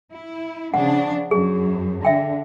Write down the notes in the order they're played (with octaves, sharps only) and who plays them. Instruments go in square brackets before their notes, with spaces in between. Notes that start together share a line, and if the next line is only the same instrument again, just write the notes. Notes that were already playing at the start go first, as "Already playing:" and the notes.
[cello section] E4
[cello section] C#3 F3 D4 [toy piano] F#5
[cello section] F#2 [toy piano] G#4
[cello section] D3 [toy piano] E5 G5